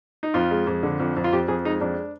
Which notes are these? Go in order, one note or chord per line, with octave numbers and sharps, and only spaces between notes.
D#4
F2 F4
G#3
F2
D3
F2
F2
F4
F2 G4
F2 G#4
G#3 D#4
F2 D4